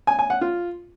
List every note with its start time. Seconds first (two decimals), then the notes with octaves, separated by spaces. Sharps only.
0.07 G#5
0.19 G#5
0.30 F#5
0.41 F4